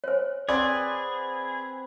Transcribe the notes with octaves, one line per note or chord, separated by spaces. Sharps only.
C5 C#5
C4 G#4 B4 D5 F#5